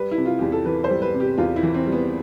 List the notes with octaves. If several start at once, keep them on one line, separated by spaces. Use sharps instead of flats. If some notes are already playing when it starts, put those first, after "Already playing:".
Already playing: G3 B4
E4
C3
F4
E2 G4
A4
E3 B4
C5
G3
B4
C3
G4
E2 F4
E4
E3
C4
G3
B3